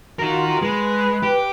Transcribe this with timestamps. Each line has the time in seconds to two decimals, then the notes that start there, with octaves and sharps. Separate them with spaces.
0.19 D#4 F4 F#4 A#4
0.62 G#3 B4
1.23 G4